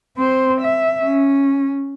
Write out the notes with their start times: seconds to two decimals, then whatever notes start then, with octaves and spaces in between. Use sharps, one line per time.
0.17 C4 C5
0.61 E5
1.03 C#4